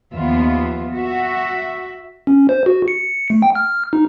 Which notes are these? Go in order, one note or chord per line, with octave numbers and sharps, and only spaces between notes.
D#2 F3 B3 F4 E5
F#4 E5
C#4
C5
F#4
C#7
A3
G5
F6
D#4